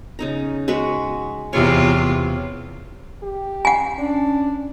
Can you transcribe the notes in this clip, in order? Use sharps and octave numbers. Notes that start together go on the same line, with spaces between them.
C#3 D#4 A#5
G#3 F#4 B4
E2 C3 F4 C#5
G4
F#5 G#5
C#4 D4